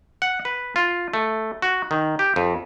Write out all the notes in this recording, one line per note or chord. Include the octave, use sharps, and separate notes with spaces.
F#5
B4
F4
A3
F#4
D#3
G4
F2